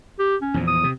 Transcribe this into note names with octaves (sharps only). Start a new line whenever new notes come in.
G4
C#4
E2 A#2 F3
D#6
C3